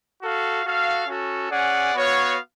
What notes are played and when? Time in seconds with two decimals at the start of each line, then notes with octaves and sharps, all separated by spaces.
0.20 F#4 A4 F5
0.64 F#4 A4 F5
1.07 C#4 F#4 A4
1.50 C#4 G#4 D5 F#5
1.94 B3 F#4 C#5 F5